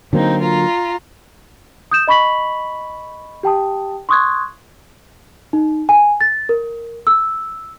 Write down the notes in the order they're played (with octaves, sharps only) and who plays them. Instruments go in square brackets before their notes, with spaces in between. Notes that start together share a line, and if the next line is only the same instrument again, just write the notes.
[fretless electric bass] D3 F#3 A#3 [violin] C4 D#4
[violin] F4 A#5
[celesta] D#6 G6 E7
D#5 B5 C#6 B6 F#7
G4 G5 A5 D#6
C6 C#6 D#6 F#6 G#6
D#4
G#5
A6
A#4
E6